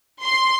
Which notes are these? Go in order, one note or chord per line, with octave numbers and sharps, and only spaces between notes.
C6